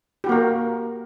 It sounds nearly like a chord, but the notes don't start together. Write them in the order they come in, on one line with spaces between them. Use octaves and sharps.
G4 F#4 A#3 A#4